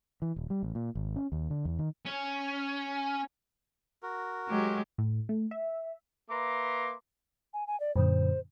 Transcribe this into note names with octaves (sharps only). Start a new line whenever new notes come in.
E3
D#1
G3
A1
A#2
G#1
C#4
D#2
D3
E2
D#3
C#4
F#4 A#4
F#3 G#3 G4
A2
A3
E5
A#3 B4 E5 A#5 C6 D6
G#5
G#5
D5
F#2 A#2 D3 C5